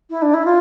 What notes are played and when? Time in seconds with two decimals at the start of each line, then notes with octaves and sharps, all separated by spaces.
0.10 E4
0.22 D4
0.34 E4
0.45 F4